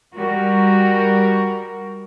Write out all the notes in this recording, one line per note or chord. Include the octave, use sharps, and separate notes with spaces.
G3 F#4 A#4